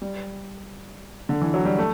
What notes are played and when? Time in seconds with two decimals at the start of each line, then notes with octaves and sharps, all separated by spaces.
0.02 G3
1.29 D3
1.41 E3
1.54 F#3
1.65 G3
1.78 A3